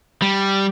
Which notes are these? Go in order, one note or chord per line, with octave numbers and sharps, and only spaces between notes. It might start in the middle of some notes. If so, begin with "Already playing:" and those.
G3